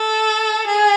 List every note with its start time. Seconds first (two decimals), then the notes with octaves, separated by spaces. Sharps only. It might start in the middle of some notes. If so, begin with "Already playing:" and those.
Already playing: A4
0.67 G#4